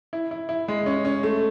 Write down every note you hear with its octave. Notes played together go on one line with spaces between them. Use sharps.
E4
E4
E4
G#3
C#4
C#4
A3